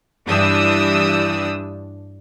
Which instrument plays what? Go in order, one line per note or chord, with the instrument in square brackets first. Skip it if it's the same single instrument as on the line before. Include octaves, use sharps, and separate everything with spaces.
[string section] G2 E3 D4 G4 D#6 E6